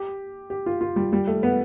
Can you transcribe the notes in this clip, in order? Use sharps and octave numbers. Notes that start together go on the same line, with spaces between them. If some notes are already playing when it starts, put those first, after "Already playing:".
Already playing: G4
G4
F4
F4
G3
G3
A3
B3